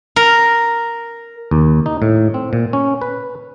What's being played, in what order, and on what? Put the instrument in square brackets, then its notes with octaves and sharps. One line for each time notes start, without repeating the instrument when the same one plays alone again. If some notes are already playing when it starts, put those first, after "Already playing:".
[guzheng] A#4
[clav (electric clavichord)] D#2
D#4
A2
C4
A#2
C#4
B4